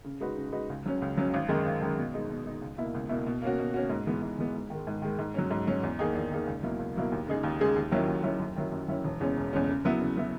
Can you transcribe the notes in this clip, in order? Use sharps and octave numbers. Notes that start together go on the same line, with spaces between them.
C#3
G#3 D#4 F#4 B4
C#3
G#3 D#4 F#4 B4
C#2
C#3 F#3 C#4
C#2
C#3 F#3 C#4
G#1
F#2 D#3 G#3
G#1
F#2 D#3 G#3
B2
G#3 D#4
B2
G#3 D#4
C#2
B2 A#3 E4
C#2
B2 A#3 E4
B2
A#3 C#4 F#4
B2
A#3 C#4 F#4
G#2
E3 G#3 B3
G#2
E3 G#3 B3
G#2
D#3 G#3
G#2
D#3 G#3
G#2
F#3 C#4
G#2
F#3 C#4
E2
D#3 A#3 D#4 G#4
E2
D#3 A#3 D#4 G#4
C#2
B2 F#3 A#3 E4
C#2
B2 F#3 A#3 E4
D#2
C#3 G#3 D#4 G#4
D#2
C#3 G#3 D#4 G#4
D#2
D#3 F#3 C#4 E4
D#2
D#3 F#3 C#4 E4
F#2
D#3 F#3 C#4 E4
F#2
D#3 F#3 C#4 E4
E1
E2 C#3 G#3 C#4
E1
E2 C#3 G#3 C#4
C#3
F#3 B3 E4
C#3
F#3 B3 E4